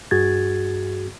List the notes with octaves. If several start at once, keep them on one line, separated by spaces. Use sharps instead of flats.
G2 F#4 G#4 G#6 A6